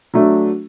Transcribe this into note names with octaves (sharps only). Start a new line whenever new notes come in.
F#3 A3 D4